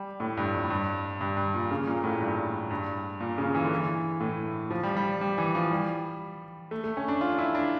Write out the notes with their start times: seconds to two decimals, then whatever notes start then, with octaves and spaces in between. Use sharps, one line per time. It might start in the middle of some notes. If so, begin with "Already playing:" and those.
Already playing: G3
0.20 A2
0.37 G2
0.54 F2
0.70 G2
1.21 G2
1.37 G2
1.54 A#2
1.71 C#3
1.87 A#2
2.04 A2
2.21 G2
2.71 G2
3.20 A#2
3.38 C#3
3.55 E3
3.64 D3
3.75 E3
4.20 A2
4.70 F3
4.83 G3
4.97 G3
5.21 G3
5.38 E3
5.55 F3
5.71 G3
6.71 A3
6.84 A3
6.97 C#4
7.08 D4
7.21 F4
7.39 E4
7.55 D4